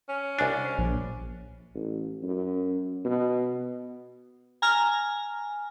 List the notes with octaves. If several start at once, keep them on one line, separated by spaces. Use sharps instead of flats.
C#4
C2 D4 B4 G#5 D6
A#1
A1
F#2
B2
G#5 A#5 F6